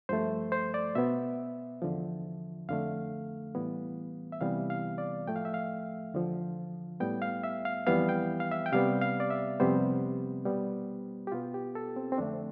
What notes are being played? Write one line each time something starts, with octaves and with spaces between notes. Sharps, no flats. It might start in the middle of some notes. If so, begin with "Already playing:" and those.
G2 F3 A3 C5
C5
D5
B2 B3 E5
E2 D3 F3
F2 D3 A3 F5
A2 E3 G3 B3
E5
C3 E3 G3 B3 F5
F5
D5
A2 F3 A3 G5
F5
E5
F5
E2 D3 F3
A2 G3 B3 G5
F5
E5
F5
F2 E3 G3 B3 F5
G5
F5
E5
G5
C3 G3 B3 F5
F5
D5
E5
F2 C3 G3 B3 C5
B2 G3 B3
G4
B2 B3 F4
G4
A4
C4
C4
F2 D3 A3 D4